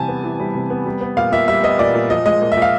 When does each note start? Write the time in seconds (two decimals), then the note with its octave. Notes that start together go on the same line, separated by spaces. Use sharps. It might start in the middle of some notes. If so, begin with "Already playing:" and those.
Already playing: C3 E3 G3 G#5 A5
0.08 B3
0.24 E3
0.40 G3
0.55 C3
0.70 B3
0.86 G3
1.01 B3
1.17 A#2 F5
1.32 A#2 E5
1.48 G3 E5
1.63 B3 D#5
1.79 A#2 D5
1.94 A#2
2.10 F3 D#5
2.26 G#3 D#5
2.42 A#2
2.52 E5
2.57 A#2
2.62 F5